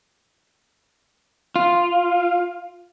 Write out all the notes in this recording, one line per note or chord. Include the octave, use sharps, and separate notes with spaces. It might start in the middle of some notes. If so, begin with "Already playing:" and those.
F4